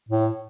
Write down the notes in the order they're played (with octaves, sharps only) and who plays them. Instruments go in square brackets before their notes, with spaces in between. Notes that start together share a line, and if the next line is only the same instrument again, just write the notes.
[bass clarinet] A2